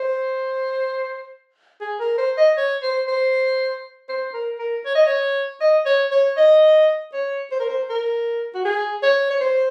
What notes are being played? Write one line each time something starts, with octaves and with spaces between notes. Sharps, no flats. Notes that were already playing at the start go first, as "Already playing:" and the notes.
Already playing: C5
G#4
A#4
C5
D#5
C#5
C5
C5
C5
A#4
A#4
C#5
D#5
C#5
D#5
C#5
C#5
D#5
C#5
C5
A#4
C5
A#4
F#4
G#4
C#5
C#5
C5